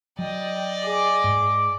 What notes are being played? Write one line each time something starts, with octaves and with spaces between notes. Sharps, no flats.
F#3 D5 D#5 G5
G#4 D6
G#2